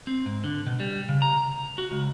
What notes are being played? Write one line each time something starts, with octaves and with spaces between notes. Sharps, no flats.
C4
G#2
D3
B2
G3
C#3
A#5
F#4
C#2